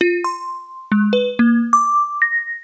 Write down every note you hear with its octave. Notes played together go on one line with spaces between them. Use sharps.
F4
C6
G#3
B4
A#3
D6
A#6